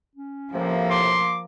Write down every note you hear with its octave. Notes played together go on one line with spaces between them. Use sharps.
C#4
A2 C3 F3 A#3
C6 D6